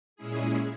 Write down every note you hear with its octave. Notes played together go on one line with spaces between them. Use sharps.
A#2 G#3 C#4 E4 G#4